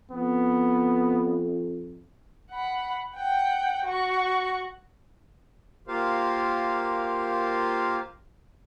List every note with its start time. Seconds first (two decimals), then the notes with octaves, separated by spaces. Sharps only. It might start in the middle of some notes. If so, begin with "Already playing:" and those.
0.12 F2 B3
2.51 F#5 B5
3.15 F#5 G5
3.85 F#4 C#6
5.88 A#3 F4 G4 A#4 C5 F5